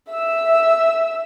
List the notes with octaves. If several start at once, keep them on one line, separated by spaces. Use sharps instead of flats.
E5 E6